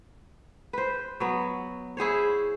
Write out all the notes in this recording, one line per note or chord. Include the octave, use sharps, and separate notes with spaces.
B4 C5
F#3 B3
E4 G#4 C5 C#5